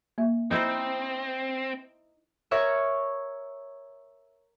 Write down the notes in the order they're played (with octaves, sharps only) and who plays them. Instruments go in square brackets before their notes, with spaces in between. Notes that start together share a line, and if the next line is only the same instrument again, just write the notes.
[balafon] A#3 E5
[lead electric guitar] C4 [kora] D#4 E4 C5
[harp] A#4 C#5 E5 C#6